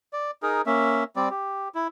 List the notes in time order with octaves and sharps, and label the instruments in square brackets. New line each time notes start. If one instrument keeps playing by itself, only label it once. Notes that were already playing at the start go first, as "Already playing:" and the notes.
[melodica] D5
D#4 G#4 A#4
A#3 C#4 E5
G3 C4 D5
G4
E4